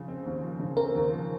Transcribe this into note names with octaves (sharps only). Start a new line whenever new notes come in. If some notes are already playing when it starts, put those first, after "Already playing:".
Already playing: C#3 F3
C4
D#2
F3
C#3
C4 A#4
D#2
F3